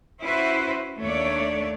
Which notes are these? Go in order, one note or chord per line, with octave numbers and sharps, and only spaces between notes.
C#4 E4 F#4 B4 C5
D#2 A3 D4 C#5 D5